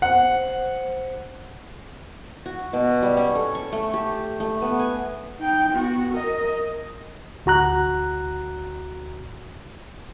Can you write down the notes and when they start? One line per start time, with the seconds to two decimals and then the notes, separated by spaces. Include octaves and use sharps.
0.02 C5 F#5
2.46 F#4
2.73 B2
3.02 G3
3.17 C#4
3.35 A4
3.55 C#6
3.72 A3
3.94 G4
4.40 A3
4.62 B3
4.79 G#5
5.40 D#4 G5
5.72 B3 F#4
6.12 A#4 D#5
7.46 D2 F#4 A#5 F#6